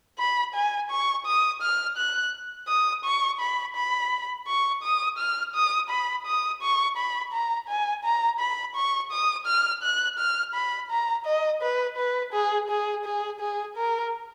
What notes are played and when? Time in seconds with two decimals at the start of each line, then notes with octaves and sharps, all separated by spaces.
0.19 B5
0.54 G#5
0.91 C#6
1.26 D#6
1.62 F6
1.97 F#6
2.68 D#6
3.05 C#6
3.40 B5
3.75 B5
4.47 C#6
4.83 D#6
5.18 F6
5.55 D#6
5.90 B5
6.26 D#6
6.62 C#6
6.97 B5
7.33 A#5
7.69 G#5
8.05 A#5
8.40 B5
8.76 C#6
9.11 D#6
9.47 F6
9.83 F#6
10.18 F6
10.54 B5
10.91 A#5
11.25 D#5
11.62 B4
11.97 B4
12.33 G#4
12.69 G#4
13.05 G#4
13.40 G#4
13.76 A#4